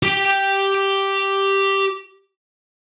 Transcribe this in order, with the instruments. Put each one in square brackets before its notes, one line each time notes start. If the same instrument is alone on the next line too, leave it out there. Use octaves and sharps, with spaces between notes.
[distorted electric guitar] G4 G5